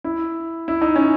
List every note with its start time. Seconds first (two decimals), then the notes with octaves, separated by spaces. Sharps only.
0.04 E4
0.68 E4
0.81 D#4
0.96 C#4